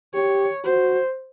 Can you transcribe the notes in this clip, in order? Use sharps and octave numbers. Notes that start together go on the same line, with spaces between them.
G4 C#5
F#4 C5